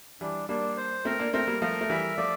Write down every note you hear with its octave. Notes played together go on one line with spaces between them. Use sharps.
E3 G3 D4
G3 A#3 D4
C5
A3 C4 A#4
A#3 D4
A3 C4 A#4
G3 A#3
F3 A3 A#4
A3
E3 G3 E5
F3 A3 D5